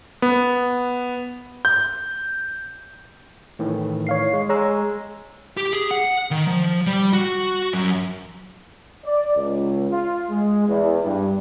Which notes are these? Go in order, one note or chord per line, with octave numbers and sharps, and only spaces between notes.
B3
G6
A2 D#3 E3
C#5 F5 C7
G#3
G#3 C#5 A#5 E6
G4
G#4
F#5
D#3
F3
G3
F#4
F#2
D5
C#2
F4
G#3
E2
G2